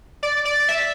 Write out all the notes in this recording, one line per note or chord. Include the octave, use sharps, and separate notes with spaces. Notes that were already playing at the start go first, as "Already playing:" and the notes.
D5
D5
E5